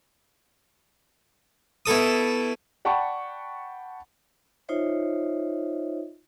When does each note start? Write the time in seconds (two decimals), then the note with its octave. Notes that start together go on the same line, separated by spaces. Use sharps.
1.86 B2 E4 A4 D#6
2.85 D5 F#5 G5 A5 B5 C#6
4.69 D#4 F4 C5 C#5 D#5 E5